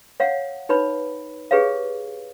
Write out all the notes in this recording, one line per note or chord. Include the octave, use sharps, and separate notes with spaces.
C#5 F5 F#5
D#4 B4 C#5 B5
G4 G#4 B4 C#5 F5